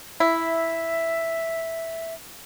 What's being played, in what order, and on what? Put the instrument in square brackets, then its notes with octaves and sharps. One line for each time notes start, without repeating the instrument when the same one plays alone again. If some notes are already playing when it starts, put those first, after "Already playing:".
[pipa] E4 [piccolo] E5